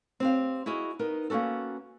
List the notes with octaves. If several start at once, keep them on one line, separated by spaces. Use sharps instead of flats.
C4 G4 F5
E4 F#4 G#4 D#5 F5
B3 D#4 A#4
A#3 B3 C#4 F#4 A4